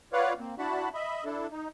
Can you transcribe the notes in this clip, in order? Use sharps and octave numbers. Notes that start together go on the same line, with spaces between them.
F4 B4 C#5 D5 F5 F#5
A#3 C4
D4 E4 F#4 F#5 A5 B5
D#5 E5 B5
D4 E4 A4
D#4